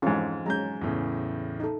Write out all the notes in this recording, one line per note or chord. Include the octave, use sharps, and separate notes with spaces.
F2 G#2 E3 C#4
F#3 G#3 C#4 A#5 G6
E2 A2 C#3
D#4 A4